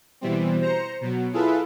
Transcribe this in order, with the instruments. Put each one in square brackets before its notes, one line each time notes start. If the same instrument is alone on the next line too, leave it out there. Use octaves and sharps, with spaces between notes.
[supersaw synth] B2 E3 G3 C4
C5 A#5 A#6 C#7
B2 F#3
E4 F4 G#4 A4 B4